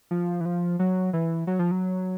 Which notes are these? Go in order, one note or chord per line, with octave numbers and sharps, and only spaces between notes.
F3
E3
F3
F#3
E3
F#3
F3
F#3